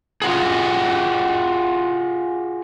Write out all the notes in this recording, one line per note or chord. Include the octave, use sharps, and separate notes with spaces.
F4 F#4 G#4